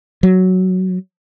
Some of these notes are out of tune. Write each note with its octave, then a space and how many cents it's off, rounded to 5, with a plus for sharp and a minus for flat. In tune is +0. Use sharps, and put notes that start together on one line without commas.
F#3 +5